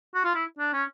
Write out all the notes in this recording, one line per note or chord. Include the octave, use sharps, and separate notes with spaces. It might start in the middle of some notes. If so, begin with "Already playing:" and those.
F#4
F4
E4
D4
C#4